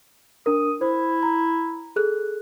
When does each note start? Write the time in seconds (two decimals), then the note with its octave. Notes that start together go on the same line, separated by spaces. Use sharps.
0.46 D4 A#4 D#6
0.81 E4 C5
1.23 A#5
1.96 G#4 A4 F#6